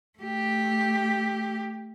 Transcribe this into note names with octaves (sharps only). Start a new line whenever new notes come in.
A3 G4